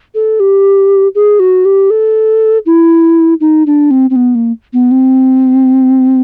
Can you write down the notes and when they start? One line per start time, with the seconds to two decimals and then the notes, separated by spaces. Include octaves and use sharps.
0.15 A4
0.40 G4
1.15 G#4
1.39 F#4
1.65 G4
1.90 A4
2.66 E4
3.40 D#4
3.66 D4
3.91 C4
4.10 C4
4.16 B3
4.35 A#3
4.73 B3
4.91 C4